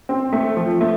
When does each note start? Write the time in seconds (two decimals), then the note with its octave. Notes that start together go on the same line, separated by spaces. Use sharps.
0.09 C4
0.33 A3
0.57 F3
0.81 A3